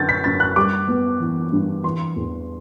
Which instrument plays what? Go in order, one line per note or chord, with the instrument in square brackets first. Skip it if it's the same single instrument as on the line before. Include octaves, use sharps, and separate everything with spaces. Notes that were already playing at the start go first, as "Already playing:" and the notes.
Already playing: [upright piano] F#2 D3 G6 A6
B6
F#2 A6
F#6
G3 D6
B3
E3
G2
E3 C6
E2